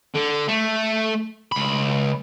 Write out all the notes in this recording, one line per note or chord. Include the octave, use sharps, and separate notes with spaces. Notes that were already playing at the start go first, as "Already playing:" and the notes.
D3
A3
C#2 B5